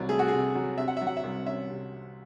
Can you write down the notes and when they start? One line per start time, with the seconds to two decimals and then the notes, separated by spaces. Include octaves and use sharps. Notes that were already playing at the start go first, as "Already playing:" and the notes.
Already playing: C2 F#3
0.09 A3 G#4
0.19 F#4
0.28 C3 G#4
0.55 F#3
0.78 C3 E5
0.88 F#5
0.97 E5
1.01 F#3
1.07 F#5
1.17 E5
1.24 C2
1.46 C#4 E5
1.70 C3